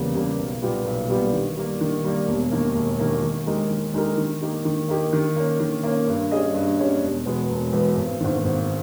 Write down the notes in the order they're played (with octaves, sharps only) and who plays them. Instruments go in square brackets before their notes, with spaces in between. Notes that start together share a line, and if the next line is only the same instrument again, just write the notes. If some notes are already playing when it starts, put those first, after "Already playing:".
Already playing: [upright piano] E2 C#3 G3 A#3
C#3 G3 A#3
B1
A#2 G3 B3 G4
B1
A#2 G3 B3 G4
D#3
G3 A#3
D#3
G3 A#3
E1
D#2 D#3 A#3
E1
D#2 D#3 A#3
D#3
G#3 D#4 G4 A#4
D#3
G#3 D#4 G4 A#4
D#3
A#3 D#4 G4
D#3
A#3 D#4 G4
D#3
A#3 C#4
D#3
A#3 C#4
G2
G3 C#4 G#4 D#5
G2
G3 C#4 G#4 D#5
E1
E2 B2 G#3 B3
E1
E2 B2 G#3 B3
G#1
G#2 D#3
G#1